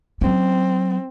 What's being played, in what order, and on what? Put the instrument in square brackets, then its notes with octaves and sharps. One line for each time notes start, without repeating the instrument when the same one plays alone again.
[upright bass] F#3 C#4 [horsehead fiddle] C4